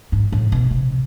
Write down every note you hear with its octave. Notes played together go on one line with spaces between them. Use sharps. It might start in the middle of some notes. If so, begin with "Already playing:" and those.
G#2
A2
B2
C3